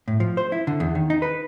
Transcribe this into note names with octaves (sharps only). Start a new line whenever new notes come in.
A2
F3
C5
E4
D3
E2
D#3
D#4
B4